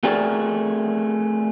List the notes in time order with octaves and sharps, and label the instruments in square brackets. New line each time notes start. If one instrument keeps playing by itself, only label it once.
[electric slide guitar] A3 C4 F#4 G#4 A#4 D5